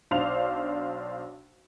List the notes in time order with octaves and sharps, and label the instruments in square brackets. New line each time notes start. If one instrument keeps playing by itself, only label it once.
[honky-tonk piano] B1 D4 C5 D5 F5 F7